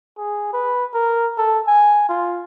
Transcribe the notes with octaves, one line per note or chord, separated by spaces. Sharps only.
G#4
B4
A#4
A4
G#5
F4